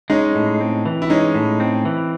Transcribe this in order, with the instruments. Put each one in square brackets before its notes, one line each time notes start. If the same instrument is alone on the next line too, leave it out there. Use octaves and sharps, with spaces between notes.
[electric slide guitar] G#3 [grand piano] C#4 D#4
[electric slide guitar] A2
C4
E3
[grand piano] E4
[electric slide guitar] G#3 [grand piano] C#4 D#4
[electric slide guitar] A2
C4
E3